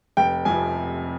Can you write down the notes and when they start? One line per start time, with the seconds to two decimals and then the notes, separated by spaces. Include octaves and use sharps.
0.17 F1 G5
0.45 F2 C3 F3 G#5